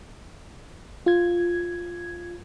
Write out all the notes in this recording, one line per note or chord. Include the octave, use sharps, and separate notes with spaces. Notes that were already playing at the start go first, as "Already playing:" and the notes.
F4 G#6